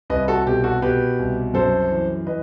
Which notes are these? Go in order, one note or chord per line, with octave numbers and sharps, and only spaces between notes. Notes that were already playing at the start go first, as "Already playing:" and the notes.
C2 B4 D#5
F#4 A4
B2 G4
F#4 A4
B2 G4 B4
C2
F#2 A4 C5
E3
E3 B4 D#5